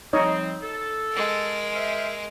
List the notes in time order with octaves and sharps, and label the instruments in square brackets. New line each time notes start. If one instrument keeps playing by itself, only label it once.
[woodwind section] F3 G3 C4 [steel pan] D#4 C#5 D#5
[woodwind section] A4
[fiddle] G#3 A#4
[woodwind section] C5 E5 F5